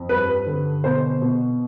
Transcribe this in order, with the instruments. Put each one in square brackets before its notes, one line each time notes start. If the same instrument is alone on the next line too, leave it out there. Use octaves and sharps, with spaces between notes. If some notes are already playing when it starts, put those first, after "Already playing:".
Already playing: [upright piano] F2
G2 B4
D3
B2 C5
B2